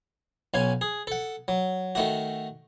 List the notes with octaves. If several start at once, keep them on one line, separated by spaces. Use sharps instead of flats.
B1 C#4 F5 G#5
G#4
A4 F#5
F#3
D#3 A3 F#4